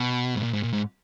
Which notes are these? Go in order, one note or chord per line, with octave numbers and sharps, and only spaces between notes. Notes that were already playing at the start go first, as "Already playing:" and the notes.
Already playing: B2
G#2
A#2
G#2
A#2
G#2